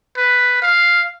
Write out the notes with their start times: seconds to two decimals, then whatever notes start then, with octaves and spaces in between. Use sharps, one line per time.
0.17 B4
0.62 F5